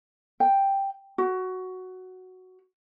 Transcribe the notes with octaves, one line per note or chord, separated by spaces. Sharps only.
G5
F#4